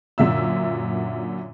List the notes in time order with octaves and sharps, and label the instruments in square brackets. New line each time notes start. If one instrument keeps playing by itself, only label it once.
[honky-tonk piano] F#2 A#2 D3 E5 E6